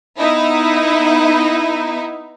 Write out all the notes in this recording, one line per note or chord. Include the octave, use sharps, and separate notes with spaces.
B3 D#4 E4